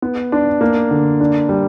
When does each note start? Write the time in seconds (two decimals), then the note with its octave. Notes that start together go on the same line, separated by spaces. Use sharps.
0.02 B3
0.32 D4
0.61 A#3
0.91 D3
1.20 D4
1.49 G3